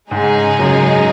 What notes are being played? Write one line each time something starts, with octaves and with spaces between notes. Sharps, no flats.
G#2 C#3 G#3 D#4 G#4
F#2